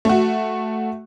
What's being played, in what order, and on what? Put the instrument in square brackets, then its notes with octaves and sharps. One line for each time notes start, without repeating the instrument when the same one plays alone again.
[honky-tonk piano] A3 F#4